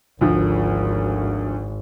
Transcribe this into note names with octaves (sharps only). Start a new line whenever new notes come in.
G#1 D2 F3